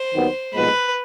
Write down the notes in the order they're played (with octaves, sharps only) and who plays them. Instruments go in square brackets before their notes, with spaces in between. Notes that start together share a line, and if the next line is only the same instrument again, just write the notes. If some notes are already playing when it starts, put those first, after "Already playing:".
Already playing: [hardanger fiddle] C5
[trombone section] D#2 D#3 F#3 B3
[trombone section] B1 A#2 F3 G#3 B3 [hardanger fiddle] B4